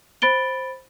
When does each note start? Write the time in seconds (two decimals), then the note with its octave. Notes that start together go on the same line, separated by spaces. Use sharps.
0.22 C5 B5 A6 D7 G7